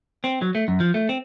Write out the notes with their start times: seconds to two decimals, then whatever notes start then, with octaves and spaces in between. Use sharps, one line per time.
0.24 C4
0.42 F#3
0.55 A3
0.68 F#2
0.80 F3
0.94 A3
1.09 C4